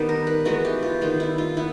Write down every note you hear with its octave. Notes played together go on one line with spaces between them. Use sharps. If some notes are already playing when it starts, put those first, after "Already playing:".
Already playing: D#3 G3 B3 G4
A#4
B4
E3 G#3 B3 F#4
G4
F4
D#3 G3 B3 F4
E4
F4
B3 E4